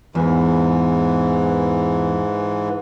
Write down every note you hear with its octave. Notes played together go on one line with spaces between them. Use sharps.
E2 G#2 E3